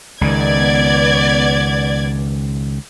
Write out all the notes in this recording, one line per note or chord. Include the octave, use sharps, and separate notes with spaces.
C#2 D#3 B3 D5 G#6